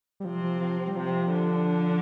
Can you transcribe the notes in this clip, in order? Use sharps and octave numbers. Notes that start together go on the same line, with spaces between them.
G3
C3 F3 C4
F3
F3
G3
C3 F3 C4
D3 D4